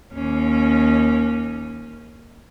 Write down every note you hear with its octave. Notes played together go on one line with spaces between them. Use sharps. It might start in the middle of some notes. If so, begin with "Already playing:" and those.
D#2 C#4